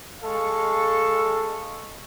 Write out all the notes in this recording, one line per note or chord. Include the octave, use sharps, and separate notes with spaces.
G#3 A4 F5 C#6